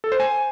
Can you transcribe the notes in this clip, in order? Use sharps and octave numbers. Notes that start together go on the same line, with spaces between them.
A4
C5
G#5